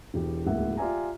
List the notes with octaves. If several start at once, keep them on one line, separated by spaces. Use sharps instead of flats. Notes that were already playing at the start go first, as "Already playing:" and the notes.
E1 E3 G4
D1 C#2 A#3 E4 E5 F#5
F4 G4 D5 E5 G#5 A#5